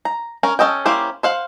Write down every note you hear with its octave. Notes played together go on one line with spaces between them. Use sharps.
A#5
C#4 A#4
C#4 A4 D#5 G5
A#3 C#4 E4 G4 C5
C5 F5 F#5